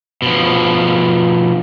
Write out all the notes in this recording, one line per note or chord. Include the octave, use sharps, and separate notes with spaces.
B2 F3